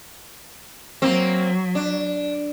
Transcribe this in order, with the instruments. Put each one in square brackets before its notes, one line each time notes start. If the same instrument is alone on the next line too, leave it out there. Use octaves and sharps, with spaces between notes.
[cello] F#3 [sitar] A#3 C4
[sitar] D4